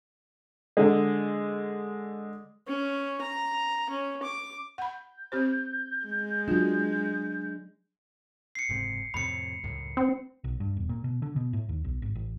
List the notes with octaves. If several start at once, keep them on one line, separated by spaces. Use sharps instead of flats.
D3 G#3
C#4
A#5
C#4
D6
F#5 B5 G6
C4 G4 C5
G#3
F#3 D4 F4 F#4
C7 C#7
F#1 G#2 C3
F2 A2 C3 B5 C#7
C#2 F#2 A2
C4
B1
G2
E1
A#2
B2
D3
B2
A2
D#2
B1
G#1
A1